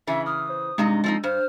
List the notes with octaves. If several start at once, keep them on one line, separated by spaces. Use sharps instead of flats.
C#3 E3 E5
D#6 F6
C5
G2 C3 G#3 D#4
F3 C4 D#4
G2 C5 F6